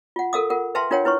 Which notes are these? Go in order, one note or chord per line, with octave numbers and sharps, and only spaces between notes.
F4 F#5
A4 A#4 F5 D#6
F4 A#4 F#5
B4 E5 F5 G5 A5 C6
D4 F4 A#4 C#5 F#5 G5
E4 B4 C#5 C#6